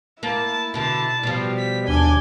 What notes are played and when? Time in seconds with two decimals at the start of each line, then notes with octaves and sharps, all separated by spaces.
0.23 A#3 E4 A5
0.74 B2 D3 A5
1.23 B2 F3 G3
1.57 B6
1.88 D#2 D4 G#5 D6 G7